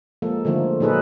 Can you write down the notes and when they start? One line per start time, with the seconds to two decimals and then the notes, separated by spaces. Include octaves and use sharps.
0.22 F3 G#3 A#3 A4
0.45 D3 D#3 F3 A3 A#3
0.80 A#2 F#3 D#4 G#4 A4 B4